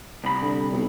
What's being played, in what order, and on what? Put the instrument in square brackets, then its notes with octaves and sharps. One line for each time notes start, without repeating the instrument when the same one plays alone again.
[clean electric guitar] C2 B5
[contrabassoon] D3
B1